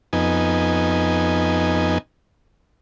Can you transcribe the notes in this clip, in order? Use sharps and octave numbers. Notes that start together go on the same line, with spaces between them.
F2 B3 D#4 G#5